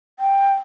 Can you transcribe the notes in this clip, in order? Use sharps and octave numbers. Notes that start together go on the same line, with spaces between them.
G5